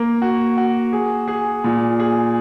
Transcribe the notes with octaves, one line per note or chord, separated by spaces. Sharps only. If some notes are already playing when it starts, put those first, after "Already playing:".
Already playing: A#3
F#4
F#4
G#4
G#4
A#2
G#4